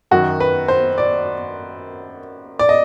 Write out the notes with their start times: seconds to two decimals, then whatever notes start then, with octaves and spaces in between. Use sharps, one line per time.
0.11 F#2 D#3 F#4
0.40 B4
0.68 C5
0.98 D5
2.59 D5
2.69 D#5